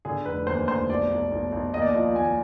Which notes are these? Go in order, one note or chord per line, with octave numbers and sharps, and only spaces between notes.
D3 G#4
F1 B4
D#2 C5
F1 C5
B1 D5
B1
B1
B1
D#2 D#5
D5
D#5
F3
D#2 G#5